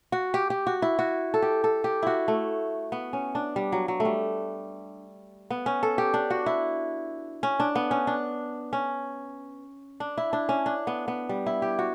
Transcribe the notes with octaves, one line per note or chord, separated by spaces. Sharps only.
F#4
G4
G4
F#4
E4
F#4
A4
G4
A4
G4
E4 F#4
A3
B3
C#4
D4
G3
F#3
F#3
A3
G3
B3
C#4
A4
G4
D4
F#4
E4
C#4
D4
B3
C#4
D4
C#4
D4
E4
D4
C#4
D4
B3
B3
G3
E4
G4
F#4